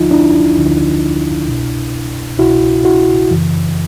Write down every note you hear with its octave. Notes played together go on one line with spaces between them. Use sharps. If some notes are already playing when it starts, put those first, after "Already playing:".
Already playing: D2 D3 F3 D#4 F4
D4 E4
D2 D3 F3
C2 B2
C2 B2 E4 F#4
E4 F#4
F#2 C#3 E3